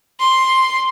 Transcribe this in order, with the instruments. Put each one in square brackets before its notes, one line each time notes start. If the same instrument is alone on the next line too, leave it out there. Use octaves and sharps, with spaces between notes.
[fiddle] C6